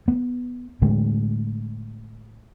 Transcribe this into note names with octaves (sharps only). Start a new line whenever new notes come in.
B3
A2 D3 G#3